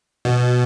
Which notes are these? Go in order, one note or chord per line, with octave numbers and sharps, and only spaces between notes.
B2